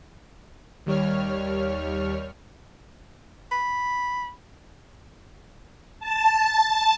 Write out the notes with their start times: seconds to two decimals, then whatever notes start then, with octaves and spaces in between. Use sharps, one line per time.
0.86 D#2 G3 C#5 F6
3.52 B5
6.00 A5